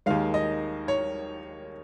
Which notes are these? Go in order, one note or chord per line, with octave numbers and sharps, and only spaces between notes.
D#2 D#3 G#3 F5
D#5
C#5